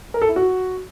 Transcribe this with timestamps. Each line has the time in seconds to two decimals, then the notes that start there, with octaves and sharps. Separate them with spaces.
0.14 A#4
0.22 A4
0.29 E4
0.36 F#4